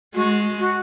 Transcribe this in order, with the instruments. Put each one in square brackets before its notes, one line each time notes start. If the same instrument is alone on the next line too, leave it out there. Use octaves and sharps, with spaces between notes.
[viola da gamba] G#3 [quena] F#4
[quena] F#4